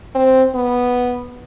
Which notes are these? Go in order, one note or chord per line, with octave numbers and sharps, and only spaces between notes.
C4
B3